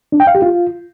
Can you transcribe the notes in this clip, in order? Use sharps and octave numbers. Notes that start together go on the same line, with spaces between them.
D4
G5
F5
G4
F4